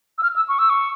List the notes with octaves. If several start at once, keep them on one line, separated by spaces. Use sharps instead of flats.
E6
F6
E6
C#6
E6
C#6